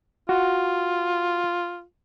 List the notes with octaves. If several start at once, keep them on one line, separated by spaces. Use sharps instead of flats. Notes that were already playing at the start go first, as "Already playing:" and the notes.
F4 F#4